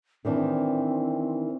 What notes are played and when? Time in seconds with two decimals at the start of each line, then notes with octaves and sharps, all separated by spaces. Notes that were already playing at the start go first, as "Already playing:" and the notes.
0.25 D#3 E3 C4 D4